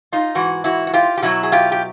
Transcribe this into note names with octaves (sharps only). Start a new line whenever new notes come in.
D#4 F4
G#2 E3 F#4
E4 F#4
F#4
F4 G4
G4
B2 F#3 E4 F#4
G#4
F4 G4
G4